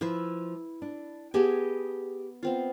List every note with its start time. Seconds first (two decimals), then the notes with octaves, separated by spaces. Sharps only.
0.01 F3 E4 B4 E5
0.82 D4
1.34 B3 G4 G#4 D#5 G#5 A5
2.43 B3 C4 F4